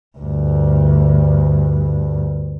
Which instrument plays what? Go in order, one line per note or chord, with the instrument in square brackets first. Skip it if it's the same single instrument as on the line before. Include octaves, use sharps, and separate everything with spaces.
[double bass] D2 G2